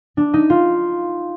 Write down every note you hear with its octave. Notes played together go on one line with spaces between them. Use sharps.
D4
D#4
F4